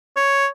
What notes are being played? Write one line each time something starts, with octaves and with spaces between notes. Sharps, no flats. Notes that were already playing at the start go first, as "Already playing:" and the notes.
C#5